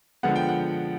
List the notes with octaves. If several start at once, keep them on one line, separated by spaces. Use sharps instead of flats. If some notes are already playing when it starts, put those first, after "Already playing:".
D3 F3 G#3 B3 F#5
G5
F#5